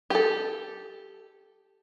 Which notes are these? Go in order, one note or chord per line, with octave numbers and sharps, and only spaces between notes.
G4 A4